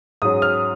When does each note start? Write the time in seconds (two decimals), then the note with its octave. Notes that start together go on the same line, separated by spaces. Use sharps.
0.22 G#2 F#3 C#4 D#6
0.42 F6